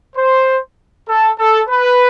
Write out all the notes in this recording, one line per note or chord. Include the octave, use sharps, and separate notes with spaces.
C5
A4
A4
B4